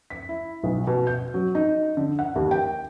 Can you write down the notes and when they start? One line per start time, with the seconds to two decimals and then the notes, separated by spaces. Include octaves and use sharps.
0.10 B6
0.29 E4
0.63 B1
0.87 B2
1.07 G6
1.34 F#3
1.55 D#4
1.97 D3
2.19 F#5
2.36 D#2
2.51 G5